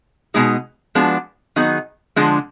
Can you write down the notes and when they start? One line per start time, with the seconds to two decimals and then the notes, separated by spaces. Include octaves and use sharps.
0.34 B2 G#3 D#4 G#4
0.95 F3 G#3 B3 D4 F#4
1.56 D#3 F#3 B3 D#4 G#4
2.16 D3 F3 G#3 D4